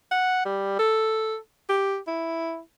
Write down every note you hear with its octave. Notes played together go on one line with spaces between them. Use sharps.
F#5
G3
A4
G4
E4